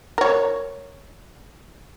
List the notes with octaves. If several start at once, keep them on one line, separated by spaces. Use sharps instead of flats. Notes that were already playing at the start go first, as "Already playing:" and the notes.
A#4 C#5